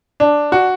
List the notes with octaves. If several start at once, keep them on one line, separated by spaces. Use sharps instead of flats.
D4
F#4